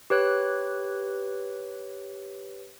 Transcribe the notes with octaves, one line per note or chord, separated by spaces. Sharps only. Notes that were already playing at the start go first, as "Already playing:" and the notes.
G4 B4 C#5 F#6